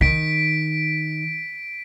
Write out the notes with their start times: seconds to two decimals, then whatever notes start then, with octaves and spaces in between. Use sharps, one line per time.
0.01 D#3 B6 D7